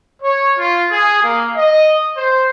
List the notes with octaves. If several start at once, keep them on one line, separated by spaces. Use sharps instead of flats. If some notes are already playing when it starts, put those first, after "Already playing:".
C#5
F4
G#4
A#3
D#5
C5